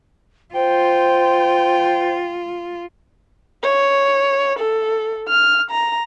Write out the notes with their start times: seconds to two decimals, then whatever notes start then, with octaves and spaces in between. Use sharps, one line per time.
0.55 F4 C5 G5
3.64 C#5
4.59 A4
5.28 F6
5.71 A#5